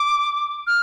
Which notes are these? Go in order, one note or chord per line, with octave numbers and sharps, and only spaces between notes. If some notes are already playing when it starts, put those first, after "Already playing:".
Already playing: D6
F6